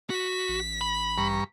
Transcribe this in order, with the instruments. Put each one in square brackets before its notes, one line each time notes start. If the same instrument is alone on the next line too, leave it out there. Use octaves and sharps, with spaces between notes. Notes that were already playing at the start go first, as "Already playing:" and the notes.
[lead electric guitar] F#4 [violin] B6
[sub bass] A1
[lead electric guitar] B5
[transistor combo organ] G2 A#5 C#6